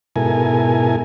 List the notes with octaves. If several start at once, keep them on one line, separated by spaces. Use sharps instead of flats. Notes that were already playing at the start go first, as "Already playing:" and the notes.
G#2 B2 E4 A4 A#4 G#5